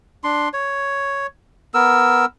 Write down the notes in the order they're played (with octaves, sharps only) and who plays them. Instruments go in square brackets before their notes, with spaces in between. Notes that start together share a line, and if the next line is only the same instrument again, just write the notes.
[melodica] D4 C6
C#5
B3 A#4 E6